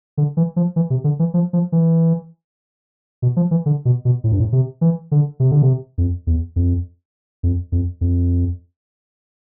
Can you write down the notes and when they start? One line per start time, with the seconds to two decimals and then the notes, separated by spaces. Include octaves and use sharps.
0.17 D3
0.37 E3
0.56 F3
0.76 E3
0.90 C3
1.04 D3
1.19 E3
1.34 F3
1.53 F3
1.72 E3
3.22 B2
3.36 F3
3.51 E3
3.66 D3
3.85 B2
4.05 B2
4.24 A2
4.32 G2
4.40 A2
4.52 C3
4.81 E3
5.11 D3
5.40 C3
5.51 D3
5.62 C3
5.98 F2
6.27 E2
6.56 F2
7.43 F2
7.72 F2
8.01 F2